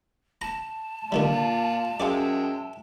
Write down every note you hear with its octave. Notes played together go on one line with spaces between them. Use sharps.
A5 A#5
A#2 D3 D#3 G3 F4 D5
F#2 G#3 F4 G#4 D5 E5 G5